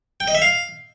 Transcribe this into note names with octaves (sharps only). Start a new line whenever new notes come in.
G5
D#5
E5
F5